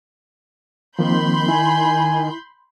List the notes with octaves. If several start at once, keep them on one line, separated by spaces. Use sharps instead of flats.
D#3 F3 A#3 C4 B5 C6 G6
E4 G#5